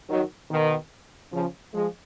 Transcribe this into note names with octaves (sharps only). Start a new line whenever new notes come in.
D#3 F#3
B2 D#3
C#3 F3
F3 G#3